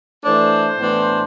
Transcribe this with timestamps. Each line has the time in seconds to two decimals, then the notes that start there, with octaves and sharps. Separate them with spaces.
0.24 E3 A3 D4 C5
0.79 A2 E3 B3 D4